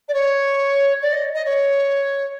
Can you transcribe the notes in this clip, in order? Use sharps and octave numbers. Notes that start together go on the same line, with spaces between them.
D5
C#5
D5
D#5
D#5
C#5